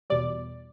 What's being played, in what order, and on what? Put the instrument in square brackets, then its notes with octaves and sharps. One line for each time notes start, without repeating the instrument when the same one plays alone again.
[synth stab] E2 B2 G3 D5